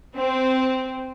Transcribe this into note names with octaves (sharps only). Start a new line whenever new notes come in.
C4